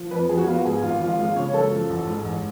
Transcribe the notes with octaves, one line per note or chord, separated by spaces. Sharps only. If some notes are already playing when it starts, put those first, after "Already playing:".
Already playing: F3
F2 B4
F3 G#4
F#4
B3 F4
F#4
G#2 G#4
G#1 F4
F3 F4
G#3 F4
C#3 C#5
F#2 A4
F3
A1
G#2
A1